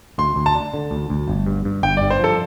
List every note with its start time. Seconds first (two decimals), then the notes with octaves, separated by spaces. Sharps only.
0.18 D2 C6
0.36 D2
0.46 A5
0.55 D4
0.74 D3
0.91 D2
1.10 D2
1.28 G1
1.46 G2
1.65 G2
1.83 G1 G5
1.97 D5
2.02 G2
2.10 C5
2.20 F3 A4